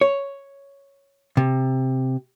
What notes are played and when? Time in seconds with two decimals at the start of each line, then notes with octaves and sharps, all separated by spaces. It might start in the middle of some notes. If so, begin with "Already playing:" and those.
0.01 C#5
1.37 C3